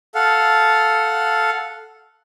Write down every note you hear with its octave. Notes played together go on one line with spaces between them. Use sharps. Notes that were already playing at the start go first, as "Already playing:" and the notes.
A4 F5 F#5